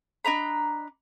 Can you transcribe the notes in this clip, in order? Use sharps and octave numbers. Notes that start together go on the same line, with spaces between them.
D4 D#5 A#5 B5